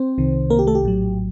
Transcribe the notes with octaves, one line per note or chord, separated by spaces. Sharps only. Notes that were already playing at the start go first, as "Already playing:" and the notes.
Already playing: C4 C5
C2 C3 D#3
A#3 A#4
G4
A3 A4
G4
A#1 A2 F#3